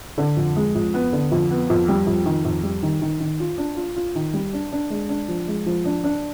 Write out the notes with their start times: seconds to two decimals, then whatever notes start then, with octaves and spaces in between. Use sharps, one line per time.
0.18 D3
0.37 F2
0.56 G#3
0.75 F2
0.94 B3
1.13 D3
1.31 F2
1.50 B3
1.70 F2
1.88 G3
2.06 F2
2.26 D#3
2.45 F2
2.63 G3
2.83 D#3
3.02 D#3
3.20 D#3
3.40 F4
3.58 D4
3.77 F4
3.96 F4
4.16 D#3
4.34 G3
4.53 D4
4.72 D4
4.90 G#3
5.09 D4
5.28 F3
5.48 G#3
5.66 F3
5.85 D4
6.04 D4